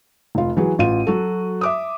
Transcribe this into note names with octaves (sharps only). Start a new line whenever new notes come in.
F1 F4
E3 F#3 G#4
A1 F4 D#7
F#3 F#4 A4
E5 D6 D#6